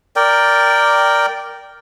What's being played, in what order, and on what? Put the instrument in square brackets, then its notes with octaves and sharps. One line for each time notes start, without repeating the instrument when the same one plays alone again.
[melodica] A#4 D5 G5